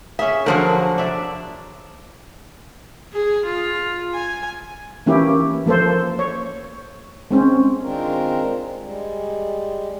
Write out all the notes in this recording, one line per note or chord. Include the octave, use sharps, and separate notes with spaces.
C#4 G#4 E5
D3 F3 F#3 A#4 C5 F#5
D4 D5 E5
G#4
F4
G#5
E3 A#3 C#4 E4 G4
F3 A#3 A4 C5
C#5
G#3 C4 C#4
D#3 G#3 C4 D4 F4 A#4
G3 G#3